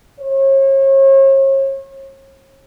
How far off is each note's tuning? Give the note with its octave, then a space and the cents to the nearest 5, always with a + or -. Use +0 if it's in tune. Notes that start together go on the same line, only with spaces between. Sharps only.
C#5 -40